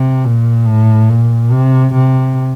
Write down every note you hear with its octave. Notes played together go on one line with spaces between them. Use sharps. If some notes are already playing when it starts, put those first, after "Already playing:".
Already playing: C3
A#2
A2
A#2
C3
C3